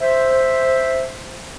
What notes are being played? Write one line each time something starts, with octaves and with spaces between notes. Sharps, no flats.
C5 E5